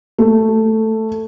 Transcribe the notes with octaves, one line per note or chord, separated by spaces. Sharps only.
A3